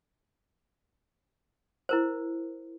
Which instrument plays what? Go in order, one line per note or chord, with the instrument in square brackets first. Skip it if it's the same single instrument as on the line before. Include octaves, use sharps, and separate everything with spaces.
[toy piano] E4 A#4 C5